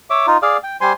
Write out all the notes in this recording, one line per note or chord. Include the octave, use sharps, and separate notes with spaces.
C#5 E5 D6
D#4 F4
G#4 D5 F5
G5
G3 C5 G#5 C6